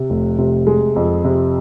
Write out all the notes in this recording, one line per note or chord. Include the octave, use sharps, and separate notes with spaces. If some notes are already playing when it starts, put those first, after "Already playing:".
Already playing: C3
F1
C3
G#3
F2
C3